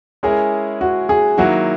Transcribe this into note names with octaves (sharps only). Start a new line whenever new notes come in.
G#3 C#4 E4 G#4 A#4
F#4
G#4
D#3 F#3 A#3 E4 F#4